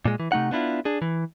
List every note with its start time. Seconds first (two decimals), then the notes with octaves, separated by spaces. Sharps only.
0.05 A#2 G#3
0.20 E3
0.32 C3 A3 D#4 F#5
0.51 B3 D4 E4 F4
0.85 D4 G#4
1.02 E3